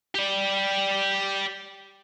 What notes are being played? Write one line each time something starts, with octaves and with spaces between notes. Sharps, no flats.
G4 D5